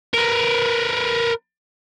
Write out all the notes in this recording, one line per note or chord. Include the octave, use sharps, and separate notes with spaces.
A#4 B4